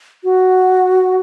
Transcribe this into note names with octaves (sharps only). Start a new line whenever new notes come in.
F#4